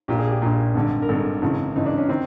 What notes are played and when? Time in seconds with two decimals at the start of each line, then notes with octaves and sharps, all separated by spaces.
0.08 A#1 A#2 G4
0.19 G#4
0.31 G4
0.42 A#1 A#2
0.74 G#1 G2 D3
1.02 A#4
1.09 G#1 G2 D3 A4
1.42 G#1 F#2 C#3 E3
1.76 G#1 F#2 C#3 E3 D#4
1.86 D4
1.98 C#4
2.08 D#3 C4